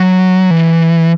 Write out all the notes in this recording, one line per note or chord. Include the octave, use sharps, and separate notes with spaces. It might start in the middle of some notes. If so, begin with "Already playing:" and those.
Already playing: F#3
E3